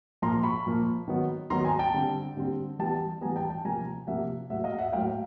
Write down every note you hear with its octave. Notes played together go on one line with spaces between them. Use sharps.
A#2 F3 A#3 A#5 C6
B5 C#6
A#2 F3 A#3
D#3 F#3 B3
D#3 F#3 B3 A#5 C6
G#5 A#5
G5 A5
D3 G3 C4
D3 G3 C4
E3 G3 B3 G5 A5
E3 G3 B3 G#5 A#5
G5 A5
G5 A5
C3 F3 A#3 G#5 A#5
C3 F3 A#3 E5 F#5
A2 F#3 A#3 E5 F#5
D#5 F5
E5 F#5
A2 F#3 A#3 F5 G5